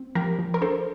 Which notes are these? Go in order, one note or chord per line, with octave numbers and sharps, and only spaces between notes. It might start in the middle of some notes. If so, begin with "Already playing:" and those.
Already playing: C4
F3 G4 A#4
F3
A#4
D4 A4 C5